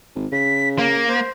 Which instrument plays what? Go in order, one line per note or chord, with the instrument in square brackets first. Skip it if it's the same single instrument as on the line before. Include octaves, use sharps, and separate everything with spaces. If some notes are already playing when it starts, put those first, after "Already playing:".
[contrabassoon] G#1
[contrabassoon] C#3 [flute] B6
[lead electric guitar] A#3 [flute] F5
[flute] C5